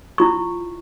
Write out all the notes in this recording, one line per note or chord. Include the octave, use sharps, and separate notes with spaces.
E4 F4 C#6